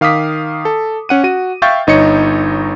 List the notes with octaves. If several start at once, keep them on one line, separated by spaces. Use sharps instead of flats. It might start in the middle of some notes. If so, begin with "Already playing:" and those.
D#3 F5 D6 D#6 B6
A4
C#4 F#5 D#7
F#4 D#7
E5 F5 G5 C#6 G6 A6
G1 D#4 C#5 D#5 C#7